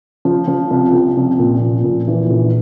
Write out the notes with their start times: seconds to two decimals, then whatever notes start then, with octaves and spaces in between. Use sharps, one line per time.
0.25 F3
0.48 F3
0.71 C2
0.93 F3
1.17 C2
1.39 A#2
1.62 F3
1.84 A#2
2.08 E3
2.30 A#1